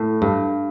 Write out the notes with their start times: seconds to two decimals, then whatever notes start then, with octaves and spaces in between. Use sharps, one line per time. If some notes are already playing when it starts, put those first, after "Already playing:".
Already playing: A2
0.22 G2